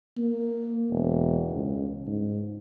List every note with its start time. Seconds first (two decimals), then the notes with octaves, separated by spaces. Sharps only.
0.17 A#3
0.90 E1
1.51 C#2
2.07 G#2